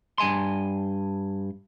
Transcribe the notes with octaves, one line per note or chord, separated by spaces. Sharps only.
G2 G#5 C6